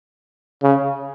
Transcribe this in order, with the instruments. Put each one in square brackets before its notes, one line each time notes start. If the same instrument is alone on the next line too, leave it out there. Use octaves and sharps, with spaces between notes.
[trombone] C#3